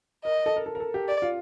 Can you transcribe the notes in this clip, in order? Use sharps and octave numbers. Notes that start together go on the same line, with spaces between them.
A#4 D#5
A4
A#4
A4
A#4
A4
G4
D5
F4